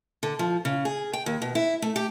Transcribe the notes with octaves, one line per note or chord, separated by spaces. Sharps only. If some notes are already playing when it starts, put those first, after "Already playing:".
D3
F3
C#3
G#4
G5
D#2
B2
E4
A3
G4